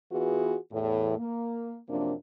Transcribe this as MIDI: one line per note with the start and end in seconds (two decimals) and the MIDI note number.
0.11 0.55 52
0.11 0.55 59
0.11 0.55 65
0.11 0.55 66
0.11 0.55 68
0.72 1.16 40
0.72 1.16 45
1.17 1.78 58
1.88 2.12 42
1.88 2.12 48
1.88 2.12 53
1.88 2.12 58
1.88 2.12 62